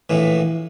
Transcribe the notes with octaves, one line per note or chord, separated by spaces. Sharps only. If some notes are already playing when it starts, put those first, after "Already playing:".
A#1 A2 E3